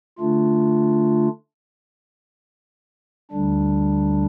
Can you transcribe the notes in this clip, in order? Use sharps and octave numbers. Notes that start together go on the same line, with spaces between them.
D3 A3 D4 F4
D2 D3 G3 D4